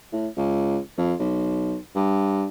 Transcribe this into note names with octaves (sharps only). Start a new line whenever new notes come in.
A2
C#2
F2
B1
G2